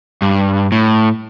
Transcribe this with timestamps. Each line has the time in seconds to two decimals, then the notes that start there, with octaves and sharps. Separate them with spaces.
0.22 G2
0.72 A2